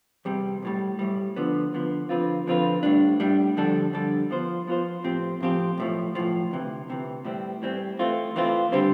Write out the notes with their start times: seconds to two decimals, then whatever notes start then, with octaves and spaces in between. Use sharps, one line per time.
0.25 E2 C3 G3
0.62 B1 A2 G3
0.99 B1 A2 G3
1.36 D2 D3 F3 B3
1.72 D2 D3 F3 B3
2.09 D3 F3 C4 F4 B4
2.47 D3 F3 C4 F4 B4
2.83 A2 G3 D4
3.20 A2 G3 D4
3.57 F2 D3 G3 D4 A4
3.93 F2 D3 G3 D4 A4
4.31 F3 B3 F4 C5
4.67 F3 B3 F4 C5
5.04 A2 F3 C4 G4
5.40 A2 F3 C4 G4
5.77 B1 A2 F3
6.15 B1 A2 F3
6.51 D2 C3 E3
6.88 D2 C3 E3
7.25 A2 E3 G3 C4
7.62 A2 E3 G3 C4
7.99 E3 A3 C4 F4
8.36 E3 A3 C4 F4
8.72 D3 G3 C4 G4 C5